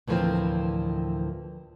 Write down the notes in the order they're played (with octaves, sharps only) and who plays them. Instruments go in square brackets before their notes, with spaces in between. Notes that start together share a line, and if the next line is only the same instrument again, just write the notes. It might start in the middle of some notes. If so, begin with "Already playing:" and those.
[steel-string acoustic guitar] D2 A2 E3 F3 A#3 C4